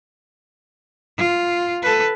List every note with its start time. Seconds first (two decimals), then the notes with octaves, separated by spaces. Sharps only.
1.18 F4
1.82 A4 B4